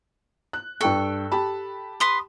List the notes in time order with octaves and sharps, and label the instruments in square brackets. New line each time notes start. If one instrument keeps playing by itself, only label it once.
[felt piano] F#6
[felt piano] G2 G5 C#6 [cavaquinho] A4
[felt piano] G4 A5 B5
[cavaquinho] B4 C6 D#6